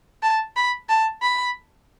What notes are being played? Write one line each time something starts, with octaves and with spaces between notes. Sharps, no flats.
A5
B5
A5
B5